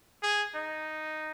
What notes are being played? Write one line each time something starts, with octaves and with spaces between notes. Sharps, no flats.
G#4
D#4